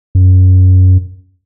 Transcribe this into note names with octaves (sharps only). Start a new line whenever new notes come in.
F#2